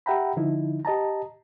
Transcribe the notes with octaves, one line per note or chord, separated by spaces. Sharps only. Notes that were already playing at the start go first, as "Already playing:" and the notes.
G4 E5 F#5 G5 A#5 B5
D3 F3 D#4 E4
G4 D#5 A5 A#5